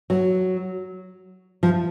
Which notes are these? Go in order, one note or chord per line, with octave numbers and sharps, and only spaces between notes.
F#3
F3